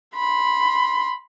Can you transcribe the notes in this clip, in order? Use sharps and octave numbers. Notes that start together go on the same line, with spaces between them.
B5 C6